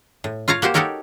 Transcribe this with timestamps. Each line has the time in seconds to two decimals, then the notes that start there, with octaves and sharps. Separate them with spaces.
0.24 A2
0.48 F4 C#5 F5 A#5
0.62 A#3 F#4 G4 C5
0.74 D#4 F#4 G4 A4 A#4 C#5